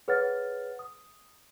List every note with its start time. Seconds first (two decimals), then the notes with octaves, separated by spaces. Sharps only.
0.08 G#4 B4 C#5 F#5 F6 A6
0.79 D#6